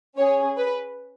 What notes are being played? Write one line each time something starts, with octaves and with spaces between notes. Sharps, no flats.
C#4 G#4 C#5
B4